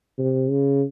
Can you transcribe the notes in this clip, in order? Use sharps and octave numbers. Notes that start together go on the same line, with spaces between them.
C3
C#3